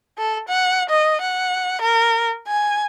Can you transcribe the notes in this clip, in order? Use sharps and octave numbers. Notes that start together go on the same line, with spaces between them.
A4
F#5
D#5
F#5
A#4
G#5